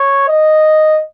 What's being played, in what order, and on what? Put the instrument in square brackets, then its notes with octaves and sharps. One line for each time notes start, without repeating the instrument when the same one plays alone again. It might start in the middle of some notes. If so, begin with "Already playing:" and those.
Already playing: [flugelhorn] C#5
D#5